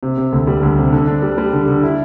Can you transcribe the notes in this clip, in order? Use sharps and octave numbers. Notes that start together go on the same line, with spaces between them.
C3
C3
D2
G3
D2
C3
D3
D4
G3
G3
D3
D3
E4